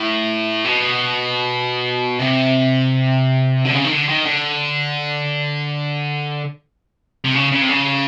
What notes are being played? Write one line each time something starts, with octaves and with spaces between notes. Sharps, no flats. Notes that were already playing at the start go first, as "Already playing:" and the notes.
Already playing: A2
B2
C3
D3
C#3
D#3
D3
D#3
D3
C3
C#3
C#3
C3
C#3